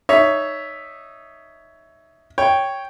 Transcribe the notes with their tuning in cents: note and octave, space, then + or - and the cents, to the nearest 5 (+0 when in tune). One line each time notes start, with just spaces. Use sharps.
D#4 -10 C#5 +15 E5 +0
C#5 +0 G5 +0